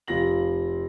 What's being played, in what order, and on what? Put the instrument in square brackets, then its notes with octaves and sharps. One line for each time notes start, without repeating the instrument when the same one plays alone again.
[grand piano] F1 F4 A#6 F#7